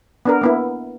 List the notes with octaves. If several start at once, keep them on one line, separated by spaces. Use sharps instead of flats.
B3 D4 A#4
A#3 B3 E4